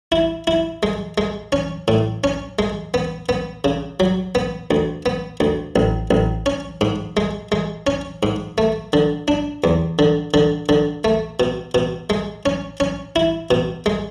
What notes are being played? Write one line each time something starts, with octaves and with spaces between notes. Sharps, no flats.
E4
E4
G#3
G#3
C#4
A2
C#4
G#3
B3
B3
C#3
F#3
B3
D2
B3
D2
A1
A1
C#4
G#2
G#3
G#3
C#4
G#2
A3
D3
D4
E2
D3
D3
D3
A3
B2
B2
G#3
C#4
C#4
E4
B2
G#3